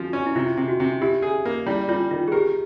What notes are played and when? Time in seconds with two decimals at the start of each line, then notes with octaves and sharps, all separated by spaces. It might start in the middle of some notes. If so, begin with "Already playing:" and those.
Already playing: F3 F#4
0.13 C#4
0.27 E4
0.36 C3 F4
0.57 C3
0.68 F#4
0.80 C3
1.01 E4 G4
1.22 G#4
1.46 A#3
1.66 G3 E4
1.89 G3 F4
2.11 D#3 F4
2.28 G#4
2.32 G4 A#4